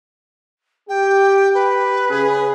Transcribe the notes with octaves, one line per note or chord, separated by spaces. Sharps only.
G4 G5
B4
C#3 C#4 G#4